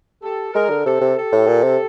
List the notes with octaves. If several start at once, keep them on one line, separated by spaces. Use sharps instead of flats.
G4 A4
G#3 G#4 A#4
D3
C3 G4 A4
C3
G4 A4
A2
A#2
C3